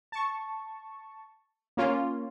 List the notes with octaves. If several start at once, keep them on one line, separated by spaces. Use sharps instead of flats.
A5 C#6
A#3 C#4 F4